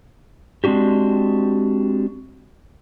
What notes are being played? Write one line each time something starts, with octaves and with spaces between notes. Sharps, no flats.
G#3 C4 D4 F#4 G4